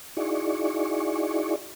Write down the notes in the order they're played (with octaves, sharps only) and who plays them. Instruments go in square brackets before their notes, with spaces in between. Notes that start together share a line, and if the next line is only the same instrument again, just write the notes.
[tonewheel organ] D#4 E4 F#4 G#4 D5 C#6